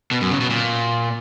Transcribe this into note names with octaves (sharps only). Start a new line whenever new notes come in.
B2
F#2
C#3
B2
A#2